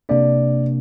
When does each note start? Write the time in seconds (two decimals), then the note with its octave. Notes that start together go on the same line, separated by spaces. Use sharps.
0.09 C3 A#3 D4 D5